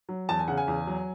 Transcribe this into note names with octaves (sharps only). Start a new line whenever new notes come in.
F#3
E2 A5
G#5
C#3 F#5
G#5
E2
F#3